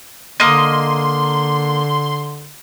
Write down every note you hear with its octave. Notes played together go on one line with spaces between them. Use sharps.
D3 A#3 D#5 C6